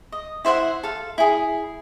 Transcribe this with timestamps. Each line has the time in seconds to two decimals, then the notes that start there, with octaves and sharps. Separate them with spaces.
0.12 D#5
0.45 E4 C5 E5 F#5
0.83 A4 F5
1.18 E4 G#4